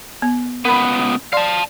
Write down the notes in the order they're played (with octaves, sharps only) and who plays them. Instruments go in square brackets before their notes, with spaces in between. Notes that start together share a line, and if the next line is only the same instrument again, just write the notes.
[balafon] B3
[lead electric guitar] C#2 B3 [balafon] A#4 B5
[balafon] D5 C6 [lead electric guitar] F5 A5